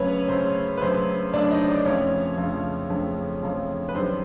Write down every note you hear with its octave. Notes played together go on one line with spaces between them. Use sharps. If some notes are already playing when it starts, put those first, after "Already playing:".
Already playing: F#2 C#3 F#3 A3 C#4 B4 C#5
F#2 C#3 F#3 A3 C5
B4
F#2 C#3 F#3 A3 C5
F#2 C#3 F#3 A3 D4 D5
D#4 D#5
D4 D5
F2 C#3 F3 A3 C#4 C#5
F2 C#3 F3 A3
F2 C#3 F3 A3
F2 C#3 F3 A3
B4
F#2 D#3 G3 C5